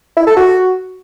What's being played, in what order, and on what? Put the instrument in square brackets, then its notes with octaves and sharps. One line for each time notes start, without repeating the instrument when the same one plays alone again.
[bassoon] E4
A4
F#4